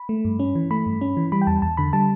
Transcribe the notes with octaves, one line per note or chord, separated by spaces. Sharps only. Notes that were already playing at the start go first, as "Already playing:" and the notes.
Already playing: B5
A3
G2
C#4
E3
A3 B5
G2
C#4
E3
G3 B5
G5
E2 A5
E2 A5
D3 B5
G3 A5